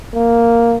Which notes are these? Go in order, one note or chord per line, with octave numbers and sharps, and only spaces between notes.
A#3